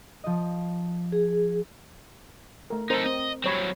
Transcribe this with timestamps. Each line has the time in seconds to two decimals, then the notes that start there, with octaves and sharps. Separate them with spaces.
0.24 F3 D#5
1.12 G#4
2.70 A3 A#4
2.90 C4 D#4 A4 A#4 C5
3.06 C4 D#5
3.44 F#3 G3 C4 C#5 B5